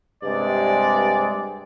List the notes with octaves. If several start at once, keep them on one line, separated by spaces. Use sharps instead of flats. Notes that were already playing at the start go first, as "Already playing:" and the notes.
G2 C3 G#3 D5